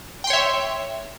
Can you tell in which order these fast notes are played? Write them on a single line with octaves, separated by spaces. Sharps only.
G5 C6 C#5 E5